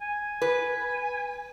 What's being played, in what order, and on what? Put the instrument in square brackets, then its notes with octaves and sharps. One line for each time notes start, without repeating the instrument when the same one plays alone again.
[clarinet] G#5
[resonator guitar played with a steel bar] B4